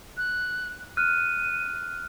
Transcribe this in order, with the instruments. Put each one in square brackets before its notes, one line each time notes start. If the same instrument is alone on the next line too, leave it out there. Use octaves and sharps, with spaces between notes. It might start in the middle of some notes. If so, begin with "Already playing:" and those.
[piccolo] F#6
[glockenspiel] F6 F#6 [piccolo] D#7